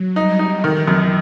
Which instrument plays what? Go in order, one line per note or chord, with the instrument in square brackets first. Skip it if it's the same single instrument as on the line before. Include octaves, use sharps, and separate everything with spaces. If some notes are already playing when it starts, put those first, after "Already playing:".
Already playing: [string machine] F#3
[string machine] G3 [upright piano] D#4
[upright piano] D#4
[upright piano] D#3 [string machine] E3
[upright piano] F#2